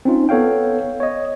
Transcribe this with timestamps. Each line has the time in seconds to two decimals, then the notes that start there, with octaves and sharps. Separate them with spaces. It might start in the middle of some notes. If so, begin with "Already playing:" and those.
0.05 C4 C#4 D#4 F4
0.29 B3 A4 C#5 F5 G5
1.00 C#5 D#5